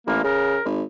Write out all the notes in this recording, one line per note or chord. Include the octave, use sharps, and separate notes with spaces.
A1 A#3
C#3 A#4
G#1